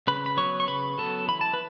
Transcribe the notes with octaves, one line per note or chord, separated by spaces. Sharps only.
C#3 B4 B5
B5
F#3 B3 C#5 C#6
C#6
C#3 B4 B5
F#3 B3 A4 A5
E3 B5
A5
B4